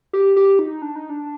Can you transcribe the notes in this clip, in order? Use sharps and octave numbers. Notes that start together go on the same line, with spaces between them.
G4
G4
D#4
D4
D#4
D4